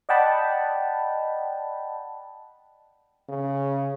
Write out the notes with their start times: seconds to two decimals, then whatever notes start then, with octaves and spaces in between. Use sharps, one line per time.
0.09 D5 D#5 F#5 G5 A5 B5
3.29 C#3